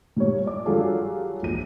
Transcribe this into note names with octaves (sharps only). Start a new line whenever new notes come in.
A#2 G3 C#5
D5 D6
F#3 G3 D4 F4 G#4 A4
A#1 D#7